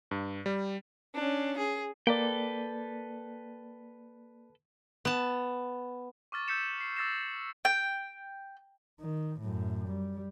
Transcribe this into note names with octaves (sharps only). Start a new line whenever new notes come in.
G2
G3
C#4 D4
G#4
A#3 A4 B4 D5 G5
B3 A5
C#6 D6 F6 A6
E6 G6 B6 C#7 E7
C7
D6 E6 A6 A#6 C7 E7
G5
D#3
F#2 A2
G3